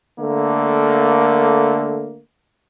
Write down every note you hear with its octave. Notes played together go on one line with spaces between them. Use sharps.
D3 A3 A#3